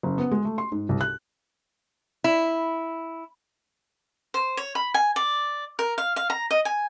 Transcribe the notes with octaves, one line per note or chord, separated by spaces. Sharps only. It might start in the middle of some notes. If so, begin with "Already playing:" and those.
F#1
B3
G#3
A3
C6
G#2
C2
F#6
E4
C5
C#5
B5
G#5
D5
A#4
F5
F5
A#5
D#5
G#5